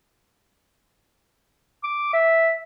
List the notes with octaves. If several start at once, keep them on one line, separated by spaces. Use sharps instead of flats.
D6
E5